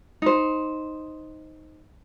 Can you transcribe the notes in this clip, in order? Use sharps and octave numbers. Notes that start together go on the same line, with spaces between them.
D#4 C5